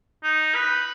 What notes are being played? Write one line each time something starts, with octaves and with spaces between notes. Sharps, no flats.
D#4
B4